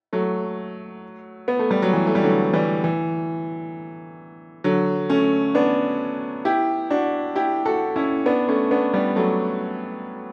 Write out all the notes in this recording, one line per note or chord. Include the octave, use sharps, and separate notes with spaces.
F#3 A3
B3
A3
G3
F#3
E3
A3
G3
D3 F#3
E3 G3
E3
D3 F#3
A3 C#4
B3 D4
E4 G4
D4 F#4
E4 G4
F#4 A4
C#4 E4
B3 D4
A3 C#4
B3 D4
G3 B3
F#3 A3